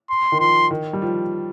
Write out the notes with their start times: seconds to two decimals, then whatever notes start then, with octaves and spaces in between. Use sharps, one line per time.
0.09 C6
0.32 D#3
0.39 F3 C6
0.71 D#3
0.93 G3
1.02 F3